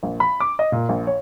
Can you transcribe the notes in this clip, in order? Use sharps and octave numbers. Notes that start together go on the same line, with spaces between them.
A#1
B5
D6
D#5
A#2
A#1
C#5